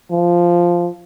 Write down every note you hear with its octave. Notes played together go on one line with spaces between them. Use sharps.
F3